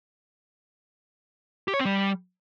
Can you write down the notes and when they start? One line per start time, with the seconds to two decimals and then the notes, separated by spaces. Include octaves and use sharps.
1.68 G4
1.74 C#5
1.80 C4
1.85 G3